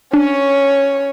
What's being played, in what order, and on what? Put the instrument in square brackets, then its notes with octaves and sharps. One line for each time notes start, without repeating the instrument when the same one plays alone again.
[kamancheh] C#4 C#5 [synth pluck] D4